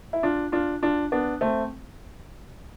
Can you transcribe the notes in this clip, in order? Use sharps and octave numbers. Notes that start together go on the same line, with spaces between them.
E4
D4 F4
D4 F4
D4 F4
B3 D4
A3 C4